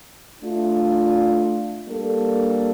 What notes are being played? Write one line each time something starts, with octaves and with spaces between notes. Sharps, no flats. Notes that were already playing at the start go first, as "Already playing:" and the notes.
A3 D4 F4
G3 A#3 D4 A4